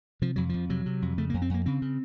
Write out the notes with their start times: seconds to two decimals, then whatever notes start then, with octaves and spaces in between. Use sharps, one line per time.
0.22 C3 F3
0.36 F2 F#3
0.49 F2 F3
0.70 C3 F#3
0.86 C3
1.02 F2
1.18 C#3 A3
1.30 F2 A#3
1.42 C4
1.50 F2 A#3
1.66 C#3 C4
1.82 C#3